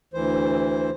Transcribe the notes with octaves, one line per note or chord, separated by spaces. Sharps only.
D2 E3 C5